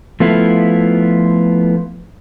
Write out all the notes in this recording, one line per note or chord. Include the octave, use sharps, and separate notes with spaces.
F3 A3 B3 E4 F4